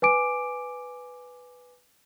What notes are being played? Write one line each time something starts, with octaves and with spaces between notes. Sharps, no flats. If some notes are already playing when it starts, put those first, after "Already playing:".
B4 G#5 D6 D7